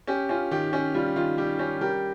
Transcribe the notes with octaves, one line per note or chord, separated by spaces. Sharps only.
C#4 G4
C#4 F4
D#3 G4
C#4 G4
G3 F4
D#3 F4
G3 G4
C#4 G4
G3 G4 A#4